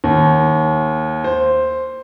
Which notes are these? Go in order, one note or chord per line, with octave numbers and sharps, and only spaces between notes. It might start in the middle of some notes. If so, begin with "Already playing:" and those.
D#2
C5